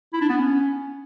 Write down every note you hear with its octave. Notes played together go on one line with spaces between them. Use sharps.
E4
D4
B3
C#4